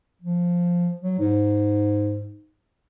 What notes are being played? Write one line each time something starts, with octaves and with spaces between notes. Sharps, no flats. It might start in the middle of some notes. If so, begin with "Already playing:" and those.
F3
F#3
G#2